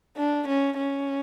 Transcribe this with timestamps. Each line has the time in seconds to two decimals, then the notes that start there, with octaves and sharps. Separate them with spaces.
0.17 D4
0.48 C#4
0.78 C#4